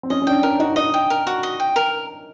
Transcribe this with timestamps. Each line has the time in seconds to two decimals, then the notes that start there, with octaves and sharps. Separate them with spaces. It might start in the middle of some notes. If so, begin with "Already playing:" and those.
0.03 C4
0.10 C#4 D#5
0.22 C#4
0.27 D4 G5
0.43 D4 A#4
0.60 D#4 F#4
0.76 D#4 D#5
0.94 G5
1.10 A#4
1.27 F#4
1.43 D#5
1.60 G5
1.76 A#4